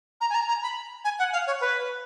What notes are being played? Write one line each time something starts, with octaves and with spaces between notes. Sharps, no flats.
A#5
G#5
A#5
A#5
B5
G#5
F#5
F5
C#5
B4